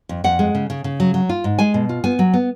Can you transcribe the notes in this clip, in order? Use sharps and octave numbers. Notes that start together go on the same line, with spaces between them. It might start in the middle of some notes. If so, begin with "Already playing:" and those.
F2
F2 F#5
G#3
C#3
C#3
C#3
F#3
F#3
F4
G#2
G#3 G#5
B2
F4
B3 G#5
F#3
B3